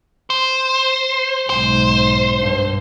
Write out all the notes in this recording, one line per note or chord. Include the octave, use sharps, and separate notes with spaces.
C5
B1 G#2 C5
G2